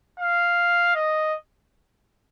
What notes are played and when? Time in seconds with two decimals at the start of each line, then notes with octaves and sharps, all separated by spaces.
0.20 F5
0.95 D#5